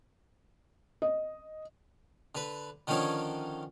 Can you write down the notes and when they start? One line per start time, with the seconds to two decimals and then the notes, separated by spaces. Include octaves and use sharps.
1.02 D#5
2.35 D3 B4
2.87 D3 D#3 F3 C#4 D4 C#5